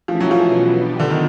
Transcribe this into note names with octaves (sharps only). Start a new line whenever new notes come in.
E3 F3 A3 C#4 E4 G#4
F#3
F3
B2 F#3 B3
B3 D4 G4
D3
D#3